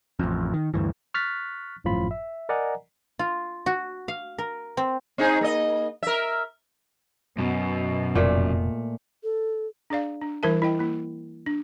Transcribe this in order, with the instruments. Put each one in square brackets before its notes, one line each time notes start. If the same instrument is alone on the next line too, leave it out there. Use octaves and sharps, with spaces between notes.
[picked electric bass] A1 F2
D#3
D2 G2 E3
[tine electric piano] C#6 F6 F#6 A6 B6
G#1 F#2 A2 F3 F4 B5
E5
A#4 D5 D#5 F#5 G#5 A#5
[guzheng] F4
F#4
F5
A#4
C4
[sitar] C4 D#4 G#4
A#3 D#5
A#4 E5
[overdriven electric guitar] F#2 [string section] B2
[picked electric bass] F1 [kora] A#2 A3
[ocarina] A4
[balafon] D4 G#4 D5 F5
D4
E3 G3 E4 A#4 E5 A5
E4 D#5 G5
A#3 E4
D4